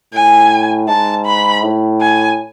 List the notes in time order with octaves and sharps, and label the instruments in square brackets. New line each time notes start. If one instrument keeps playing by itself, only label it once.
[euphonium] A2 [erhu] G#5
[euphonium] G#2 [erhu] A5
[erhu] B5
[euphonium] A2
[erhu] G#5